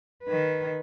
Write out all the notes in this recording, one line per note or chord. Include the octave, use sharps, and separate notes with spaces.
D#3 B4